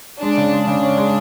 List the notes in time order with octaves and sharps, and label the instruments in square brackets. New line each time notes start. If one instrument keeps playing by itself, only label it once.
[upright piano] G#3 [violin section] D4
[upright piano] C#3
G#3
[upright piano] C#3 [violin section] D4
[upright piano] C#4
G#3